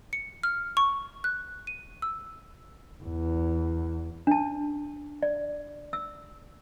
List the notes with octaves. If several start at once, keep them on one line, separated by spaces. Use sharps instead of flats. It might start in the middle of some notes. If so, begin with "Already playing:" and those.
C#7
F6
C#6
F#6
D#7
E6
E2
D4 A5
D5
E6